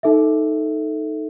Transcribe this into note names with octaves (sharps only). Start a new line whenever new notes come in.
D#4 A4 E5